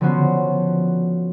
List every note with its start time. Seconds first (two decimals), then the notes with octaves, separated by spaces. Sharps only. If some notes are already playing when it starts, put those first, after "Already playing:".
0.01 D3 F3 B3 C#4 F#4 C5